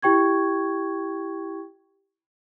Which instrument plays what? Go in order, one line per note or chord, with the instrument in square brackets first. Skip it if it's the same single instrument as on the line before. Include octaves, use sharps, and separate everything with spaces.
[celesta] E4 G4 G5 C#6 G#6